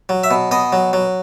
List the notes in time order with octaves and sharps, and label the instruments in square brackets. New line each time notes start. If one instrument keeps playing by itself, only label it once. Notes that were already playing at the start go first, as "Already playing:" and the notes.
[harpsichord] F#3
E5
B2
B2 D#5
F#3
F#3